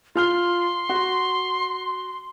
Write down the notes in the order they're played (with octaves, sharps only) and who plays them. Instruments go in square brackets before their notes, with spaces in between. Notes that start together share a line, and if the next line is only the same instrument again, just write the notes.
[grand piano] F4 F6 G7 [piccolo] C6
[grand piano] F#4